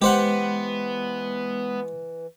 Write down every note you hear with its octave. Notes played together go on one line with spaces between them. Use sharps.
E3 G#3 B3 G4 C5 F#5